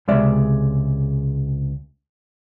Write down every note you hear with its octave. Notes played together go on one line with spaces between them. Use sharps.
C#2 C3 G#3 D5 E5